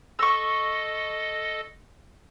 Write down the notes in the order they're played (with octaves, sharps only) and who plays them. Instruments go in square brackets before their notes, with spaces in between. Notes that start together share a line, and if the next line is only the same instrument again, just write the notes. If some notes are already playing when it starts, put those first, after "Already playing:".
[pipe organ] A4 D#5 [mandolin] C#6 E6